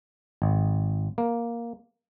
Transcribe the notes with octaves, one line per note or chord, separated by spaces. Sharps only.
G#1
A#3